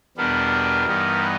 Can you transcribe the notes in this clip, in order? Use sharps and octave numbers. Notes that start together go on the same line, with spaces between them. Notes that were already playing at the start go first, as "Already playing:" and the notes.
E2 B2 G3 B3 D4 A#4
G2 E3 G3 B3 D#4
B4